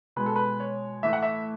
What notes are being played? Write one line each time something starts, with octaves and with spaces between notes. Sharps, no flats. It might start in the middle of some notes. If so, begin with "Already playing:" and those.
B2 G#3 B4
A4
B4
C#5
A2 E3 A3 E5
F#5
E5